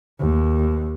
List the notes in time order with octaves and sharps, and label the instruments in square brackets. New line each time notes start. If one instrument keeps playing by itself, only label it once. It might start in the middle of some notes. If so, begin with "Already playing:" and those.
[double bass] D#2